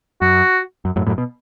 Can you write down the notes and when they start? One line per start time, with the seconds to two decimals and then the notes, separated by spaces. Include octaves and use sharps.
0.21 F#2 F#4
0.85 F#2
0.96 F#2 A2
1.07 F#2 A2
1.18 B2